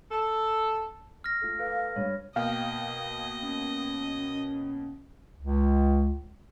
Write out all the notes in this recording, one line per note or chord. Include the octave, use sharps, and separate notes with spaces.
A4
F6 A#6
A3 F4
A4 B4 F5
G2 C#5
B2 A#3 D#5 F5 G5
C#4
C#2